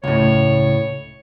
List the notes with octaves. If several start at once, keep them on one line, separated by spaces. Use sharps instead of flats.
C#2 A2 C#5